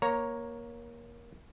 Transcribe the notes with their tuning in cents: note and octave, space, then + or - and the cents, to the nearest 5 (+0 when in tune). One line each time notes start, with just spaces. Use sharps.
A#3 +15 C#5 +0 A#5 +0